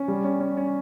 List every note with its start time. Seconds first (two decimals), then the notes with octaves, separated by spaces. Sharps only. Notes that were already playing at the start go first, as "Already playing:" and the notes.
Already playing: C#4
0.08 G3
0.24 C#4
0.40 C#4
0.57 C#4